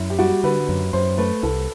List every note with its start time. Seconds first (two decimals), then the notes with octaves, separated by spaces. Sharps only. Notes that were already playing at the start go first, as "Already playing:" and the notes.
Already playing: F#2 E4
0.10 G4
0.19 G3 F#4
0.43 D3 B4
0.69 F#2
0.93 F#2 C5
1.18 A3 B4
1.43 C2 A4